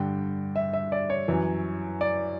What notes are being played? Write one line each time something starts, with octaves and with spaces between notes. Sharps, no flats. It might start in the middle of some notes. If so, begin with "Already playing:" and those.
Already playing: G2 D3 G5
E5
E5
D5
C#5
F#2 E3
D5